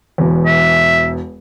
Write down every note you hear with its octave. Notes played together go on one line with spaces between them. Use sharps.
E1 E2
E5